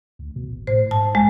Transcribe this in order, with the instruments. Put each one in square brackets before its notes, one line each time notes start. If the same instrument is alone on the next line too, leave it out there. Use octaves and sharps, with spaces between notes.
[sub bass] D2
B2
G#1
[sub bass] A2 [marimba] C5
[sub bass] G#2 [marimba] A5
[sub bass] B1 [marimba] G#3